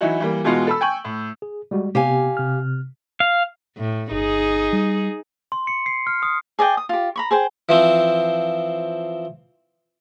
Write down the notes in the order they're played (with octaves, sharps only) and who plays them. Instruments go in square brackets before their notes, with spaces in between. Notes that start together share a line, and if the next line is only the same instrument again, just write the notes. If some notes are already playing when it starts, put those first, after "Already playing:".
[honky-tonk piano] E3 F#3 D#4 E4 F#4
E3 G3 A#3
B2 E3 G#3 B3 F4 F#4
A4 B5 E6
G5 G#5 C#6 G6 F#7
A2
[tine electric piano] G#4
G3 G#3 F#4
[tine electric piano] C3 B3 [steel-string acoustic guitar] G4 F5 G#5
[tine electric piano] C3 F6
[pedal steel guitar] F5
[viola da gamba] A2
[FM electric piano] G1 [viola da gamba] D#4 G#4
[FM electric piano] G3
[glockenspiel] C6
C#7
C7
F6
D#6
[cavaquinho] G#4 D5 D#5 G5
D#6
F4 G4
A#5 B5 C#6
G#4 C5 G5
[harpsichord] E3 F3 C4